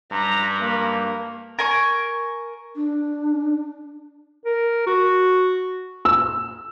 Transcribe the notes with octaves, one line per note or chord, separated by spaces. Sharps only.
G2 A#5
A#3
A#4 G#5 C#6
D4
A#4
F#4
E6